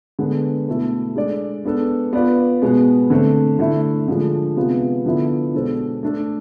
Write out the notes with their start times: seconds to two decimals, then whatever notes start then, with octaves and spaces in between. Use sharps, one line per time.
0.19 D3 G#3 B3
0.68 B2 A3 E4 A4
1.16 G#3 D4 A4 D5
1.64 G#3 B3 D4 A4
2.13 B3 F4 B4 D5
2.62 B2 G#3 B3
3.10 D3 A3 C4
3.59 D3 A3 E4
4.08 D3 F3 G#3
4.56 C3 G#3 B3 F4
5.06 D3 F3 B3 E4
5.53 B2 G#3 D4 A4 C5
6.03 A3 D4 A4